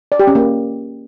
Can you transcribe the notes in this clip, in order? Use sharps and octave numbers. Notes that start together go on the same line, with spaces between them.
D5
G4
C#4
A#3